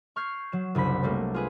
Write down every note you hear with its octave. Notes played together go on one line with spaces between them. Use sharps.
C#6 F6 G6 G#6 C7
F#3 E7
F#1 C2 D4 B5 B6
F#3 G3 A3 A#3
F4 G#4 B4